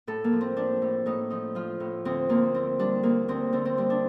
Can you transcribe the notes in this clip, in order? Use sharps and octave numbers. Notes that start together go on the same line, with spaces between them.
A2 A4
A#3
F3
C4
F3 D4
A2
A2 D#4
F3 D#4
F3 F4
A2
D2 C4
D2 A#3
D3 C4
G3 D4
D2 A#3
D2 C4
D3 C4
C4
G3 C4
D4